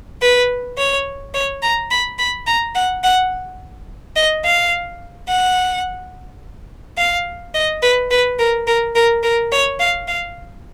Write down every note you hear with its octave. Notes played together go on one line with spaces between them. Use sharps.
B4
C#5
C#5
A#5
B5
B5
A#5
F#5
F#5
D#5
F5
F#5
F5
D#5
B4
B4
A#4
A#4
A#4
A#4
C#5
F5
F5